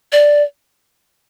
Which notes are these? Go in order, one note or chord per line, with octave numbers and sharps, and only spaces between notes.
D5